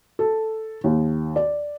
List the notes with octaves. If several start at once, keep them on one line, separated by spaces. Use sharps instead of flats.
A4
D#2
D5